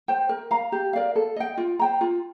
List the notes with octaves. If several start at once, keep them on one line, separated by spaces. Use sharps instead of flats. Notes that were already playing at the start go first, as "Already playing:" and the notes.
C5 G5
A#4
F5 A#5
G4
A#4 D5 F5
A4
D#5 G5
F4
C5 G5 A#5
F4